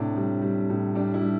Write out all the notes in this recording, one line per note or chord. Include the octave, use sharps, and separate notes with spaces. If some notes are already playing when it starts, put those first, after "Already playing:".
Already playing: A2 C3 D4
G3
G3
A2
G3 D4
E4
G3